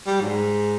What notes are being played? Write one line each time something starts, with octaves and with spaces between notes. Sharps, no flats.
G3
G#2